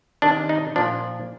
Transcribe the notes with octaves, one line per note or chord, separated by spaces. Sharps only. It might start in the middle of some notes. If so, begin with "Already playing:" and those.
C3 D#3 D4
D#4
A#2 F3 D4